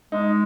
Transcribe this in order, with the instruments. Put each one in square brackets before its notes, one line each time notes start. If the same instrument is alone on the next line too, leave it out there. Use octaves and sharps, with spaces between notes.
[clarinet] G#3 [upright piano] D#4